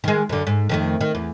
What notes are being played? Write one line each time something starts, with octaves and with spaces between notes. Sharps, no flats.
D#3 G#3
F#2 D3
G#2
F2 D#3 A3
D#3
E2